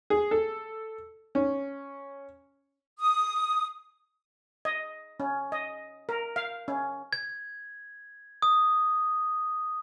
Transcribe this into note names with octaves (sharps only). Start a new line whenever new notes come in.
G#4
A4
C#4
D#6
D#5
C#4
D#5
A#4
F5
C#4
G#6
D#6